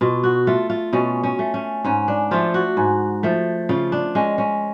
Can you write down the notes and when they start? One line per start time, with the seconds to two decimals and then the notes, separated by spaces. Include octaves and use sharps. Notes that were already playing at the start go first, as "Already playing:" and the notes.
0.01 B2 F4
0.24 F#4
0.47 A3 F4
0.70 F4
0.93 B2 C#4
1.23 C#4
1.39 A3
1.54 C#4
1.84 G#2 C#4
2.08 D4
2.31 F3 A3 F4
2.54 F#4
2.77 G#2
3.23 F3 A3
3.69 C#3 F4
3.92 D4
4.15 G#3 C#4
4.38 C#4